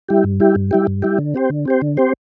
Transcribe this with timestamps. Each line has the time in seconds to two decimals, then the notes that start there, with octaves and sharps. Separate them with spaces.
0.09 G3 E4 G4
0.24 G2
0.40 G3 E4 G4
0.55 G2
0.71 G3 E4 G4
0.87 G2
1.02 G3 E4 G4
1.18 D3
1.34 C4 G4 C5
1.50 D3
1.65 C4 G4 C5
1.82 D3
1.97 C4 G4 C5